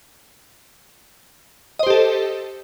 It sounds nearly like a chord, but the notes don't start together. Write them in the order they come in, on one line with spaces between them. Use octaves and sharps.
D#5 C5 G4 A4